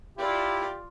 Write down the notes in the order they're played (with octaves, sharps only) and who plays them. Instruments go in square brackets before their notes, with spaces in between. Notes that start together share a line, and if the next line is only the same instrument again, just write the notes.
[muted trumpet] E4 [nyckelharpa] F4 D5 [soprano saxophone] G4